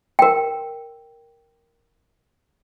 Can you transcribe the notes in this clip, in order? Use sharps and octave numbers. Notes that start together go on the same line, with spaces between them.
A#4 G5